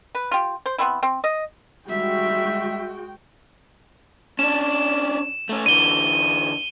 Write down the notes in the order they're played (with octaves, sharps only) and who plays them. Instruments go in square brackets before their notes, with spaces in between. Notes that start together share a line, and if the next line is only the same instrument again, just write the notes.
[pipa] B4
F4 G4
C5
B3 C4 E4
C4
D#5
[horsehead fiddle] G3 E5 [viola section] G#3 F#4 G5
[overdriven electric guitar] C#4 D4 [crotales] E7
[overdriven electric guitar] A3 C#4
[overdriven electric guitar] D3 E3 [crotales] D#7 G7